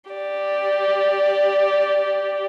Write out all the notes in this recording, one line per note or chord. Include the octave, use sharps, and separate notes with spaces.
G4 D5